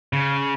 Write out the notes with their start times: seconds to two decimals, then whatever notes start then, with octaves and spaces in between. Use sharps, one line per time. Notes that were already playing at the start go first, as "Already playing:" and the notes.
0.13 C#3